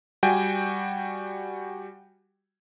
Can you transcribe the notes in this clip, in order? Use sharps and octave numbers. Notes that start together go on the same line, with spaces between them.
G3 F#4 G5 G#5